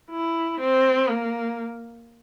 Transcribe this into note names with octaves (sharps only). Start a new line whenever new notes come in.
E4
C4
A#3